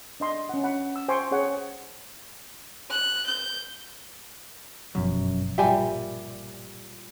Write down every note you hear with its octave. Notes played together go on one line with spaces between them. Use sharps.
D4 D#5 C6
C#4 F#5
F#5 B5
E6
C5 G5 G#5 C6 C#6
C#4 G#4 C#5 F#5
F#6
G6
G1 F#2 B2 F3
A#2 G3 G4 E5 G#5